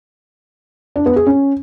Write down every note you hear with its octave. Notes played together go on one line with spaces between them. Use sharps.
D4
B3
G#4
C#4